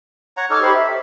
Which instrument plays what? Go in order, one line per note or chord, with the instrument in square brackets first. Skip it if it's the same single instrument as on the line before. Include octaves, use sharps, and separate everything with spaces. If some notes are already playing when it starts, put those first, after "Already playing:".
[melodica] C#5 F#5 A#5
[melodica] D#4 A4 C#5 [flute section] D6 F6
[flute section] G4 C5 B5
E5
[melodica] A4